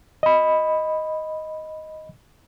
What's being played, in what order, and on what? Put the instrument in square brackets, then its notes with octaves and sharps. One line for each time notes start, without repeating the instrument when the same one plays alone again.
[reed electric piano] D#5 B5